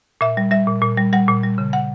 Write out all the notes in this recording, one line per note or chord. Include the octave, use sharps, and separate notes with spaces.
A#2 E5
G3
G3 E5
A#2
A#2
G3
G3 F#5
A#2
G3
C#3
F#5